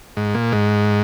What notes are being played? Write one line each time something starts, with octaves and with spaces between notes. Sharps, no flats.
G#2
A#2
G#2